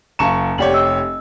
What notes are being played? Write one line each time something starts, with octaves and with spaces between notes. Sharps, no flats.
F#1 F5 A5 A#5 C#6 E7
F1 G4 C#5 D5 F#5 F#7
D#5 E6